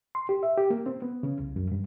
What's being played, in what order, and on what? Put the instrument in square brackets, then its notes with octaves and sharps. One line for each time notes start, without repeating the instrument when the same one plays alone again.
[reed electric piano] C6
G4
E5
G4
A#3
C4
B3
C#3
C2
F#2
G2